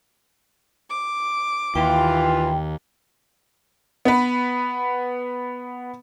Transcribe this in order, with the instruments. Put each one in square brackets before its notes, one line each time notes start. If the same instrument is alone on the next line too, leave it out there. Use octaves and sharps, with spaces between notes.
[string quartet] D6
[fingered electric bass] D#2 [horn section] E3 F4 [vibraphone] G5
[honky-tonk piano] B3 B4